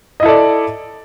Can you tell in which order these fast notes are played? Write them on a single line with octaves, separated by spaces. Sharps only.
D#5 E4 A4 D5